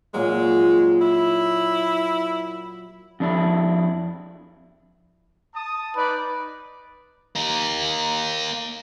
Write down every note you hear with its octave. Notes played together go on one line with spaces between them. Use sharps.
A#2 F#3 G#3
E4
F2 D4 E4
A5 D#6
D#4 B4 D5
A#3 D#4